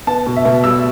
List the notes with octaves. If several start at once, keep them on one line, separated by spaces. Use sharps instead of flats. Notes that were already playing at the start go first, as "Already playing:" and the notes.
B3 A5
B2
E5
B2
G3 E6